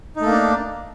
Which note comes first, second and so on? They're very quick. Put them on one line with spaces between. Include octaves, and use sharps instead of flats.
D#4 A3 A#3 D4